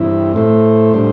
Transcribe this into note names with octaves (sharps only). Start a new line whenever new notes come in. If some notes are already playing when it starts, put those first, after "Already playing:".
Already playing: G2 E3 C4 E4
A2 A3 E4 C5
A2 G3 D4 C5